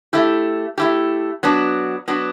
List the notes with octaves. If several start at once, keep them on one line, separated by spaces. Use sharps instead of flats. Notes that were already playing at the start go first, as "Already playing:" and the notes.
A3 E4 G4
A3 E4 G4
F#3 B3 D4 F#4
F#3 B3 D4 F#4